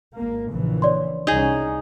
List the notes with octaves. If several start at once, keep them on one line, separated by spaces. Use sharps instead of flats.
G#1 A#3
A#1 C#3 E3
C#5 D5 C6
C2 C#4 D#4 G#4